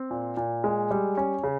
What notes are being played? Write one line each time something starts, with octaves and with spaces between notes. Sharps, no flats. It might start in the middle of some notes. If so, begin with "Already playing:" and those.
Already playing: C4
A#2
A#2
G#3
G3
C#4
C#3